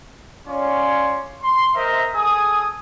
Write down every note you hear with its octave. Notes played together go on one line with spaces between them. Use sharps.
C#4 F4 C#5 D5 C6
C6
A#4 C5 D#5 E5
G#4 A4 D#6